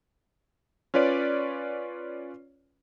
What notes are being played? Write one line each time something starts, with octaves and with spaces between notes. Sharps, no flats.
C#4 F4 B4 C#5 D5